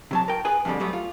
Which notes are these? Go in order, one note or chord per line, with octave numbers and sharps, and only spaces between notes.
C3 F#3 A5
A#4 G5
G#4 B4 G#5
F2 G#2 B2 D3 G3
F#3 G3 A3 B3
F4